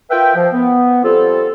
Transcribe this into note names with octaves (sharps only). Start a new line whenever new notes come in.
F4 A#4 B4 E5 G5
F3
B3
F3 G3 C4 F4 A4